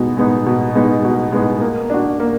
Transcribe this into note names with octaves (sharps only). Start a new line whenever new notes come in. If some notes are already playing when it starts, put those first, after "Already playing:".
Already playing: B2 G#3 B3 D#4
G#3 B3 D#4
B2
G#3 B3 D#4
B2
G#3 B3 D#4
A#3
D4 F#4
A#3